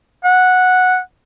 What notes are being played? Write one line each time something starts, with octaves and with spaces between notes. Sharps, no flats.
F#5